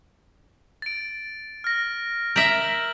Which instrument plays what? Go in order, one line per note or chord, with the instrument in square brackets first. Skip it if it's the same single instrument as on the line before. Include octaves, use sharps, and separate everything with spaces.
[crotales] A6 D7
F6 A#6
[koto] A#4 E5 [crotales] G6 F#7